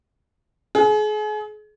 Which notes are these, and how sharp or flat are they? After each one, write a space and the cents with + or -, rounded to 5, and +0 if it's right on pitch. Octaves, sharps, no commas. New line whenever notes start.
G#4 +35